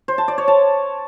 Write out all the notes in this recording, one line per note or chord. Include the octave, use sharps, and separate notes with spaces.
C5
A5
D5
C#5
A5